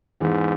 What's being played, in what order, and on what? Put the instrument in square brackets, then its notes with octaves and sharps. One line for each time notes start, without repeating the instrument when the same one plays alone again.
[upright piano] E2 E3 [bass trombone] G#2